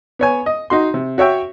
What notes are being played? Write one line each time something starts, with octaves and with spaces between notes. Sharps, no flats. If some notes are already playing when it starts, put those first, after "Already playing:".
B3 C#5 G#5
D#5
D#4 F#4 C6
C3
F#4 C#5 E5 G5